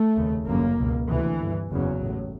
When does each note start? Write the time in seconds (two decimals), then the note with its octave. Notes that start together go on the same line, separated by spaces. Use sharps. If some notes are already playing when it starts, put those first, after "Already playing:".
Already playing: A3
0.16 F1 D#2 C#3
0.46 G1 F#2 C#3 A#3
0.78 C#2 B2
1.09 D2 C3 E3
1.39 G1 G2
1.70 F#1 E2 C#3 F#3
2.01 A1 A2